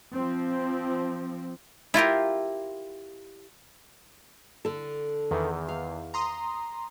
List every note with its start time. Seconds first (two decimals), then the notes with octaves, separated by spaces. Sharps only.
0.14 F3 C4
1.94 E4 F4 G4 A#4
4.65 D3 A4
5.31 E2 D#3
5.68 F5
6.14 A#5 C6 D#6